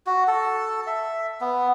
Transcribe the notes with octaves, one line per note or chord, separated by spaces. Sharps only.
F#4
A4
E5
B3